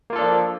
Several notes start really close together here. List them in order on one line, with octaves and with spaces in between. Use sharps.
A#3 F4 A4 D4 F3